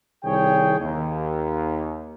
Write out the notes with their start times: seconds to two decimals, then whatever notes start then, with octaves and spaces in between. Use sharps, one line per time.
0.24 C2 D#3 G#4 C#5 G5
0.79 D#2